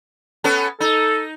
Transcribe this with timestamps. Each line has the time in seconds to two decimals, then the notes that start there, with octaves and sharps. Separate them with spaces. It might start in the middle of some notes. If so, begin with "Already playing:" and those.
0.44 B3 C#4 A4
0.80 D#4 A4